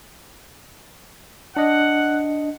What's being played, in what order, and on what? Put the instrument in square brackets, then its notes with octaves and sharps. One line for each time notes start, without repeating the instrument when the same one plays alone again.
[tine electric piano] D4 D#5 [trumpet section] F#5